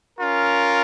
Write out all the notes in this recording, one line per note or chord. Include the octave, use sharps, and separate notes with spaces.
C#4 F4 A#4